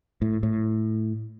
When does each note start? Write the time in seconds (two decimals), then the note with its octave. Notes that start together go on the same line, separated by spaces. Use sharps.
0.22 A2
0.43 A2